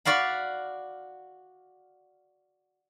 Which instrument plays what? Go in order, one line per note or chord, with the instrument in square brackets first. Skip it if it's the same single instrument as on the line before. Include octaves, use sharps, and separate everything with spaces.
[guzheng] F#4 D5 F5 B5